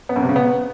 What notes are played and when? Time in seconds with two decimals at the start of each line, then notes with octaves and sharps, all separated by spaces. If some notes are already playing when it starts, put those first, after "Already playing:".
0.09 B3
0.16 F#2
0.22 C3
0.29 C#3
0.36 B3